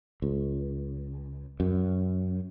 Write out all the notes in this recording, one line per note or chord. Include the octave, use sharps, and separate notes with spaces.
C#2
F#2